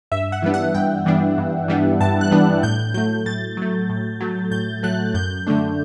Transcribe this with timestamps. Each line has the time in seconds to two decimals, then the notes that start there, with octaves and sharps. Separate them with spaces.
0.11 G2 E5
0.32 F#5
0.42 E3 G3 B3 D4
0.54 F#5
0.75 G2 G5
1.06 E3 G3 B3 D4
1.38 G2
1.68 E3 G3 B3 D4
2.01 G2 A5
2.21 F#6
2.31 E3 G3 B3 D4
2.63 A2 G6
2.94 F#3 A3 G6
3.26 A2 A6
3.57 F#3 A3
3.89 A2
4.20 F#3 A3
4.51 A2 G6
4.83 F#3 A3 F#6
5.14 F#2 G6
5.47 D3 A3 D4